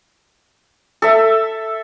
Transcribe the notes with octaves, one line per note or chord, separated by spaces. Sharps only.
A4 E5